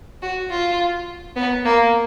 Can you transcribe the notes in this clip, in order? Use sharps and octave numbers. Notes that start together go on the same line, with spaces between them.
F#4
F4
B3
A#3